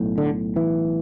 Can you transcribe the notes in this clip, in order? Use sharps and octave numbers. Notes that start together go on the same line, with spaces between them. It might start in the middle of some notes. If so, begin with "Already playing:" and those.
Already playing: B1 A2
D3
E3